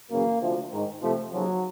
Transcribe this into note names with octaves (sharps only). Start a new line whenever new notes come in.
F#2 C#3 E3 A#3
D2 C3 F3
G#2 D#3
F2 C3 F3 A3
D#2 C#3 F3 F#3